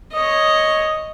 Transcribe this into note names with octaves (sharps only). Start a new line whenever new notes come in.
C#5 D#5